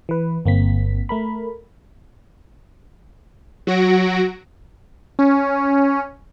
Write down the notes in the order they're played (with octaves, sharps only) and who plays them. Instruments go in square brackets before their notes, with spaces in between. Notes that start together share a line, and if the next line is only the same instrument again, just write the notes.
[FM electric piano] E3 B4
G1 A#3 C4 B6
A3 A#4 B5
[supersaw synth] F#3 F#4 A#6 D7
[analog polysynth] C#4